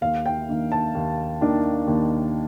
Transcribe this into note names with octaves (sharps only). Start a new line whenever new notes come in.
D#2 F5
G5
D#3 A#3 D4
A5
D#2
D#3 A#3 D4
D#2